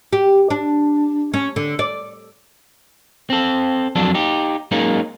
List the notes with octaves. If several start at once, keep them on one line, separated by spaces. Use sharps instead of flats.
G4
D4
C#4
D3
D5
C4 A4
F2 F#3 D4 A4
D#4 G4
F#3 G#3 A#3 C#4 D#4